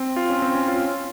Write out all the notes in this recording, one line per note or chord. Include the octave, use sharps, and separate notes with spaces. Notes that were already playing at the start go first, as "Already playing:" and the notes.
Already playing: C4
F4
C#4
C4
C#4
F4